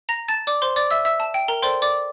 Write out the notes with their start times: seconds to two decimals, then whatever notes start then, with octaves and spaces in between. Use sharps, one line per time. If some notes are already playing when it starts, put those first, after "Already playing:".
0.09 A#5 A#6
0.28 A5 A6
0.47 D5 D6
0.62 C5 C6
0.76 D5 D6
0.91 E5 E6
1.05 E5 E6
1.20 A5
1.34 G5
1.48 A#4 A#5
1.62 A4 C5 D5 G5 C6
1.82 D5 D6